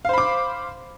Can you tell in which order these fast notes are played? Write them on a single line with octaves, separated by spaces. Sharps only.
F5 C5 B5 D6